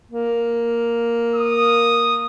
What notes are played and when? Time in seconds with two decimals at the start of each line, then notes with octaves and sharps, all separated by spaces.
0.11 A#3
1.36 D#6